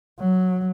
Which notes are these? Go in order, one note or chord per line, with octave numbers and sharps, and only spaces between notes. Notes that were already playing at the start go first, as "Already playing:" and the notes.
F#3